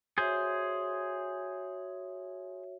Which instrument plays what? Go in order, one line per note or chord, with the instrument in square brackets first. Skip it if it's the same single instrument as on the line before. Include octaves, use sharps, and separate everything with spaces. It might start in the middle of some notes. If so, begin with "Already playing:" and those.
[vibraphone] F#4 C#5 E5 [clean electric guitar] G#4 C5